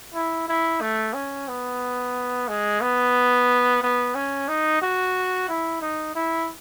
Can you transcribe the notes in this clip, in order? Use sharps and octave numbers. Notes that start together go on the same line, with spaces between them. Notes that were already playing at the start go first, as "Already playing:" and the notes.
E4
E4
A3
C#4
B3
G#3
B3
B3
C#4
D#4
F#4
E4
D#4
E4